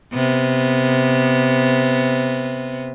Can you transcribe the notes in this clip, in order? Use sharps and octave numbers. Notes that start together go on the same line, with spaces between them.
C3 B3